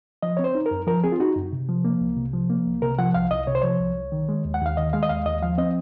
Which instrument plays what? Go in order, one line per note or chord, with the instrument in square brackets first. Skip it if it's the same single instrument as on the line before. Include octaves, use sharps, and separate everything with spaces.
[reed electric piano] F3 D#5
C4 C#5
C5
D#4
A#4
F#2
F3 A#4
C4 G#4
F4
D#4 F#4
F#2
C3
F3
A#3
C2
C3
F3
A#3
C2
C3 A#4
F3 F#5
C2 F5
C2 D#5
C3 C#5
C5
F3 C#5
C2
C2
D#3
G#3
D#2
F#5
D#2 F5
D#3 D#5
G#3 F5
D#5
D#2 F5
D#2 D#5
F3 F5
C4 D#5